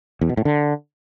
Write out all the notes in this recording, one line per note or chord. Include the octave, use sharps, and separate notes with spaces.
E2
B2
A2
D3